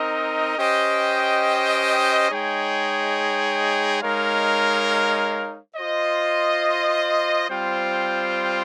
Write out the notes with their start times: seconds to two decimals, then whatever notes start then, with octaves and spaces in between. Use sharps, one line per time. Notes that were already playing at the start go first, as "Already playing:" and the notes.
Already playing: C4 D#4 A#4 D#5
0.56 C#4 G4 C5 D#5 G5
2.30 G#3 D#4 G#4 C#5 G5
4.02 G#3 D#4 A#4 C#5 F5
5.75 F4 C5 D#5
7.49 G3 C4 F4 C5 G5